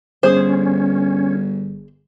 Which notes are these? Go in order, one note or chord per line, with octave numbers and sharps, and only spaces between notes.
G1 C#4 G#4 C5